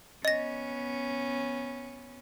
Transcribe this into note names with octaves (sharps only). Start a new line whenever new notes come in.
B3 C#4 D#5 A#6